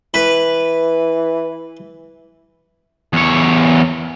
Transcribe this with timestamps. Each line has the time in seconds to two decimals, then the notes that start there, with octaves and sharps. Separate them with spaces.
0.14 E3 B4 B5
3.13 E2 C#5